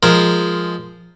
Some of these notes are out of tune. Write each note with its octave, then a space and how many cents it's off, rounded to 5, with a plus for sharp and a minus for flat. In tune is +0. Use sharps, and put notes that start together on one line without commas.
F3 +0 G#3 +0 A#4 +0